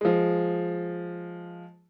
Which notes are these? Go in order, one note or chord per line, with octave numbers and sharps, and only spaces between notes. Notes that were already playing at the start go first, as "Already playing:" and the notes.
F3 G#3